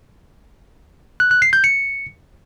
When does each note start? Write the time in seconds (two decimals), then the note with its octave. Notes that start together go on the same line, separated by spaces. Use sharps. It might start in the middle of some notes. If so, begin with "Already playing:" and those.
1.20 F#6
1.31 F#6
1.42 C7
1.53 G6
1.64 C#7